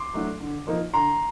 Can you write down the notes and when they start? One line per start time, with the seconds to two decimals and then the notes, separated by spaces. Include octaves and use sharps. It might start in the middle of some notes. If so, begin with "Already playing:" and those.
Already playing: C6 D6
0.14 F#3 A3 D4
0.40 D3
0.67 F3 A#3 D#4
0.94 D3 A#5 C6